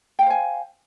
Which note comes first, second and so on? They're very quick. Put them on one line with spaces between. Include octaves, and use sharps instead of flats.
G5 F5 C5 G#5